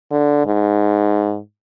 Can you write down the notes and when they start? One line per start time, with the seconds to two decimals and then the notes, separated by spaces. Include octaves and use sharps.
0.11 D3
0.46 G#2